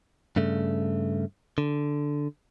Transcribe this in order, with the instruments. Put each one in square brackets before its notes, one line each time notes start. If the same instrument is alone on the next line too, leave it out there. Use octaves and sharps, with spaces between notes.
[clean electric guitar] G2 C#3 A3
D3